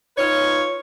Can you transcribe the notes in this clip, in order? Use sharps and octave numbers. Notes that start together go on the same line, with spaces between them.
D#4 F4 B4 C#5